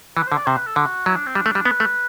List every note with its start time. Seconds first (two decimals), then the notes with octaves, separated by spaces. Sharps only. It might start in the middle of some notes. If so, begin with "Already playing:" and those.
0.17 E3 B4
0.27 C5
0.32 D3
0.36 D5
0.46 C3 C5
0.57 B4
0.66 A4
0.76 D3 F#4
1.06 F#3 E4
1.16 D4
1.26 C4
1.35 G3 D4
1.46 A3
1.55 G3
1.65 B3 B4
1.80 A3